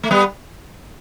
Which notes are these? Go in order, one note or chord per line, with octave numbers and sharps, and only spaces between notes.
A3
G3 B3